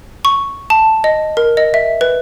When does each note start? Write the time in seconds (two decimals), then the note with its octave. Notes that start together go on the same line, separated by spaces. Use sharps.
0.25 C#6
0.70 A5
1.04 D#5
1.37 A#4
1.57 D#5
1.74 E5
2.01 B4